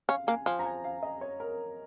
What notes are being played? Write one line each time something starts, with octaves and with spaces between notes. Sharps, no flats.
C#4 F5
A#3 G#5
F3 G#5
A#5
G#5
F5
D#5
C#5
A#4